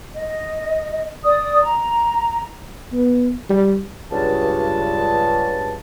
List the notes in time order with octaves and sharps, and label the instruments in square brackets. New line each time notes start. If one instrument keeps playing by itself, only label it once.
[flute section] D#5
D5 D#6
A#5
[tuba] B3
G3
[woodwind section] C#2 G2 A5